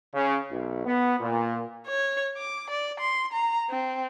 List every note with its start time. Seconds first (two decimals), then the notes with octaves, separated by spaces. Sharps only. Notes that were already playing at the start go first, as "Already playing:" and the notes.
0.14 C#3
0.51 B1
0.85 B3
1.20 A#2
1.88 C#5
2.37 D6
2.71 D5
3.00 C6
3.33 A#5
3.70 C4